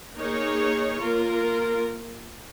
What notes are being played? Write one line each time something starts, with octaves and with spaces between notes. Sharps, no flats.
A#3 D#4 G#4 C#5
A#3 F4 A#4